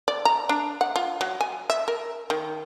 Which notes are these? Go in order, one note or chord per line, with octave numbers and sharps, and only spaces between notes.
D5
A#5
D4
F#5
F4
F#3
G#5
E5
A#4
D#3